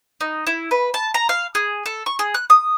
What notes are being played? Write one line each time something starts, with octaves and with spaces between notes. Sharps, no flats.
D#4
E4
B4
A5
A#5
F5
G#4
A4
C#6
G#4
F#6
D#6